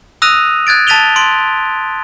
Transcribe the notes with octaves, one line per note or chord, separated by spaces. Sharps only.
D#6 E6 F#6 A#6 D#7 F7
F#6 G#6 A6 D7
A5 A6 B6 D#7 F7 G7
C6 D7